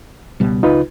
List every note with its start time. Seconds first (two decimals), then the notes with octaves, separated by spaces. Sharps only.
0.40 C#2 B2 G3
0.63 C#2 D#4 F4 B4